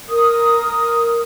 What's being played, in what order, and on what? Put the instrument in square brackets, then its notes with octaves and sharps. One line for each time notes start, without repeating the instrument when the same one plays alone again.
[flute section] A#4 D#6